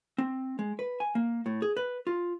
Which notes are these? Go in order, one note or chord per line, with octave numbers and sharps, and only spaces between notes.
C4
G#3
B4
G#5
A#3
A2
G#4
B4
F4